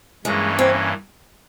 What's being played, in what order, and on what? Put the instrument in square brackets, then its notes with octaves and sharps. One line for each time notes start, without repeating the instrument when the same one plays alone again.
[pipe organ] G2 E3 A#3 C#4 [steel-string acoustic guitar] G#3
[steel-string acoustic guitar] C4